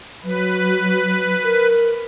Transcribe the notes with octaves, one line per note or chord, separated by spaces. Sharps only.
F#3 B4
A#4